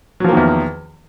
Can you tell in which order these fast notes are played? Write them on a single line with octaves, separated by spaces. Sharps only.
F#3 F3 A#3 D#3 E2